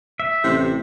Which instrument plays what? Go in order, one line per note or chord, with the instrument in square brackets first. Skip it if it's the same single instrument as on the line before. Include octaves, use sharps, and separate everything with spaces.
[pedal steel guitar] E5
[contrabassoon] A1 [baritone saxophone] C3